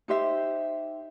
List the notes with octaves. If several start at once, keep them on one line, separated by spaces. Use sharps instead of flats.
D#4 G4 C5 E5